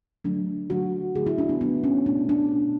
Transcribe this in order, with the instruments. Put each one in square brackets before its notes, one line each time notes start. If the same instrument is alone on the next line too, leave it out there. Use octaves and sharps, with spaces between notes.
[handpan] D3 F#3 A3 D4
D3 F#3 A3 F#4
D3 F#3 A3 G#4
E4
D4
B3
D3 F#3 A3 B3
C#4
B2 A3 D4
D4
B2 A3